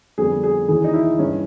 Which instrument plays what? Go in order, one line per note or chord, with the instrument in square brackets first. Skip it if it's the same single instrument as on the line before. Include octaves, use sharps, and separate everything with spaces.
[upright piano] F2 D3 G3 B3 G#4
G#4
D#2 C#3 E3 G#4
D#4
E4
G2 E3 G#3 C#4